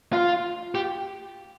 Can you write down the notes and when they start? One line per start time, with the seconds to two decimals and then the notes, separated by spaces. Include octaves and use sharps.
0.13 F4
0.75 G4